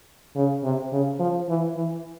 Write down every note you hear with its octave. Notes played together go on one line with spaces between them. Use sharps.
C#3
C3
C#3
F3
E3
E3